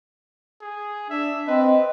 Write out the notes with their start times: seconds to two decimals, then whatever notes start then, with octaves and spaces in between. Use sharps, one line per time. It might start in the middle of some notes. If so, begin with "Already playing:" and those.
0.61 G#4
1.10 D4 E5
1.47 C4 B4 D#5